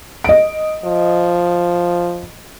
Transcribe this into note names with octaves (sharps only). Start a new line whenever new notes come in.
D#5 D7
F3